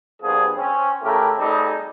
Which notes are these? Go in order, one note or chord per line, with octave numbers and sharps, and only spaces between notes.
A#1 G2 F3 B3 C4 G#4
C4 C#4
C#3 A3 E4 G4 A#4
G3 A3 C4 D#4 G4 G#4